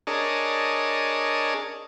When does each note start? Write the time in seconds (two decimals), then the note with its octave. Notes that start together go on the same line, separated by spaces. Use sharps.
0.07 D4 G#4 A#4 C#5 D#5 A5